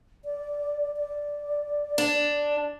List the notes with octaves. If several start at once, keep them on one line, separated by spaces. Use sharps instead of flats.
D5
D5
D4